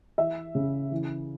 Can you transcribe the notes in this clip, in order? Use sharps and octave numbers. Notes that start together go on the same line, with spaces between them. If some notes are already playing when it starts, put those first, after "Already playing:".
E3 E5
C#3
E3